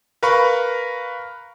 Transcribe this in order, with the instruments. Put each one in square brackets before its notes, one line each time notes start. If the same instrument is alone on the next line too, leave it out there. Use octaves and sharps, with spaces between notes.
[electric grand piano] A#4 B4 F5 B5 C#6